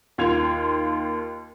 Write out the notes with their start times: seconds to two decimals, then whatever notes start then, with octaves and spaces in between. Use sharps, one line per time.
0.18 D#2 F4 G#6 F7